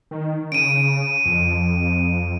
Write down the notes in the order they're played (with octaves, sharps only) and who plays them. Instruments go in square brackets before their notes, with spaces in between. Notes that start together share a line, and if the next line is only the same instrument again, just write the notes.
[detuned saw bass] D#3
[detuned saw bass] C#3 [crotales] D7 D#7
[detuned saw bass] F2